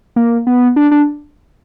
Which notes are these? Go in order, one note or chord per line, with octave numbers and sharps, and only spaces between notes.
A#3
B3
D4
D4